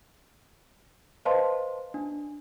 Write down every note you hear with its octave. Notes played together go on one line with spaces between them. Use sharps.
B4 C5 D#5 F5 A5 C6
D4